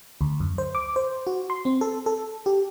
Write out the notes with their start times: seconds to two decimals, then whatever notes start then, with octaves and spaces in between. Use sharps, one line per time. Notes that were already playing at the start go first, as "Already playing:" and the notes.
0.21 D2
0.40 F#2
0.58 C5
0.75 D6
0.96 C5
1.27 F#4
1.50 C6
1.65 C4
1.81 A4
2.06 A4
2.46 G4